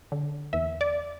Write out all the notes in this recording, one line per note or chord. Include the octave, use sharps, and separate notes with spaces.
D3
E2 E5
D5